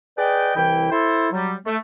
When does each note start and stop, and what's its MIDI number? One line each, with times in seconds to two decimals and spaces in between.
0.18 0.52 68
0.18 0.52 71
0.18 0.52 74
0.18 0.52 75
0.18 0.52 79
0.55 0.90 36
0.55 0.90 52
0.55 0.90 64
0.55 0.90 79
0.91 1.27 64
0.91 1.27 69
0.91 1.27 72
1.32 1.54 54
1.32 1.54 55
1.65 1.76 57